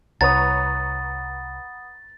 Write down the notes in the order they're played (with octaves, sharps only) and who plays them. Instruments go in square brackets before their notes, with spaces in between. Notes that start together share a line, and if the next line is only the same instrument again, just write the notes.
[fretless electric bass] C2 [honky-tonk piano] B4 C#5 A#5 [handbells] F#5 B5 D#6 [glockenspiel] A6